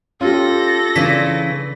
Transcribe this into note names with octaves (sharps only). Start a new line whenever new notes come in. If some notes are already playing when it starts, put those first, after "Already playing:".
C#4 F4 G4 A4 A#6
C#3 E3 D4 B6